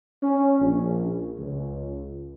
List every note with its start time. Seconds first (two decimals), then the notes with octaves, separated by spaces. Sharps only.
0.22 C#4
0.60 A#1
1.39 C#2